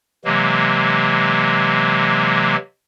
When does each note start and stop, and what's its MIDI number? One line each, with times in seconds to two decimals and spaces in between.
0.25 2.56 48
0.25 2.56 52
0.25 2.56 54
0.25 2.56 56
0.25 2.56 58